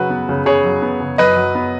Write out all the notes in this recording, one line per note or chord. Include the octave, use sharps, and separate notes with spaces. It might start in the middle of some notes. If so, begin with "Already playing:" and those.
Already playing: C#3 F#3 F#4 B4
B3
C#3
C#3 G#4 C#5
F#3
B3
C#3
F#2 B4 D#5
F#3
B3